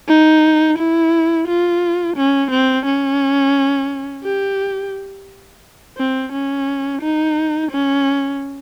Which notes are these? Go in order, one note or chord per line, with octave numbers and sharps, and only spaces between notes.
D#4
E4
F4
C#4
C4
C#4
G4
C4
C#4
D#4
C#4